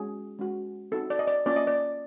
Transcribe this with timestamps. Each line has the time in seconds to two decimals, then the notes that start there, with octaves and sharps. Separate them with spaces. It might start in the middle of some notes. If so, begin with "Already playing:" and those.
Already playing: G#3 C#4 F#4 G#4
0.39 G#3 C#4 F#4
0.91 C4 D#4 F#4 A4
1.10 D5
1.19 D#5
1.27 D5
1.46 A#3 C#4 F4 D5
1.56 D#5
1.67 D5